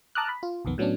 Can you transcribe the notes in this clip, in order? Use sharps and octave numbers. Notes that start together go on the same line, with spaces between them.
A5 A#5 D6 D#6 F6 F#6
B5
F4
B1 F2 D#3 B3
A2 F#3 B3 C#4 D4